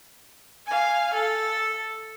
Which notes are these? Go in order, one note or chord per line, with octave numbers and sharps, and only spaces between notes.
F5 G#5
A4